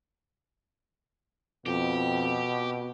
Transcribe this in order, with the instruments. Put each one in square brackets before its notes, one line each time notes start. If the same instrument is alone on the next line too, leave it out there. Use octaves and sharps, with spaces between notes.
[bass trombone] F2 [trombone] B2 [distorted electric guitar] G4